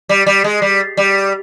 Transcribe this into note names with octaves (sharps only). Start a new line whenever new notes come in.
G3
G3
G#3
G3
G3